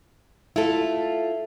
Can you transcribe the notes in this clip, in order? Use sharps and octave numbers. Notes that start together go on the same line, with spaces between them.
A3 E4 F4 A4